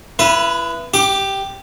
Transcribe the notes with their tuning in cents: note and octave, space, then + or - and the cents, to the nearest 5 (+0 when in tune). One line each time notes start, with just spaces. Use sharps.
E4 +30 B4 -15 D#6 +0
G4 -5 D6 +20